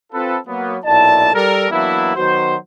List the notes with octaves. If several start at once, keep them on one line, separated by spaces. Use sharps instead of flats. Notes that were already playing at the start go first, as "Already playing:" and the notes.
C4 F4 A4 B4
F#3 A#3 B3
B1 A#2 E4 D5 A5
G3 A4 A#4
E3 F#3 A#3 B3 D4 E4
D#3 F#3 B3 F#4 C5